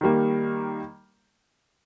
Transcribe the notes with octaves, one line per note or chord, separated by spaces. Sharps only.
D#3 G3 A#3